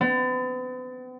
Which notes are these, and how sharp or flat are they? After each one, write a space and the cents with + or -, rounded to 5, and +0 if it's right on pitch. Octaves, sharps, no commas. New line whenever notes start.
B3 +45